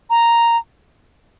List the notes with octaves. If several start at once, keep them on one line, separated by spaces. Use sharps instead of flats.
A#5